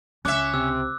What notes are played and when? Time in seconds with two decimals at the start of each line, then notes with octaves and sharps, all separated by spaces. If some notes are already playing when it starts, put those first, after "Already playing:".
0.25 C#2 C#4 E5 D6 F#6
0.54 C3 E6